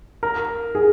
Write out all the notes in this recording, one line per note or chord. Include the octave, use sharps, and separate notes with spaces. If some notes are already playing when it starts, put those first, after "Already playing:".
A#4
G#4